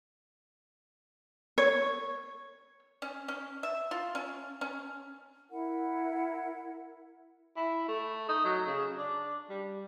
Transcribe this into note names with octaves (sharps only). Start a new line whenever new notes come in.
C#5
C#4
C#4
E5
F4
C#4
C#4
E4 A#4 F#5
E4
A3
D#4
F#3
C#3
D4
G3